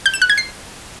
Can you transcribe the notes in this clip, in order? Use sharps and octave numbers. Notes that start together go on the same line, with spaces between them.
G6
E7
F#6
G#6
C7